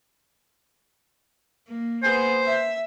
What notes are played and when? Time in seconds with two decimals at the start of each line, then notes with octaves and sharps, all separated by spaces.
1.67 A#3
2.03 A#3 B3 G#4 C5
2.44 E5